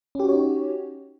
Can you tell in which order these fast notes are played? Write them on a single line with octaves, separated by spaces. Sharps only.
C#4 G4 F#4 C#5 D#4